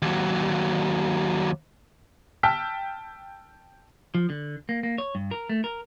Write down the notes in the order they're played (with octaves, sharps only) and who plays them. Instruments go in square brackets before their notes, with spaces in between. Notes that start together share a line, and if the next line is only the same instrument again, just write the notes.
[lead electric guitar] D#2 F#3
[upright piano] G5 A5 E6 F6 B6
[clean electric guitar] F3
D3
A#3
A#3
C#5
G2
A#4
A3
A#4